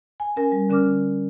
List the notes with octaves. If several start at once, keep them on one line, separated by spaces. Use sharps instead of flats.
G#5
C#4 A#4 G#5
G3
D3 C#4 A#4 D6 F6